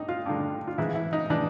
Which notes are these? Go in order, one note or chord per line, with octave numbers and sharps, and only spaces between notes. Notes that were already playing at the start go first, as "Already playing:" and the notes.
Already playing: G2 D#4
F4
G2 D3
F4
G#2 E3 E4
E4
D#4
E3 D4